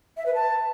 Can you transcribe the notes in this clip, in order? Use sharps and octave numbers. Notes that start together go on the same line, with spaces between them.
E5
B4
A5